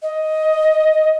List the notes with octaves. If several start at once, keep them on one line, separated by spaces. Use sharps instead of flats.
D#5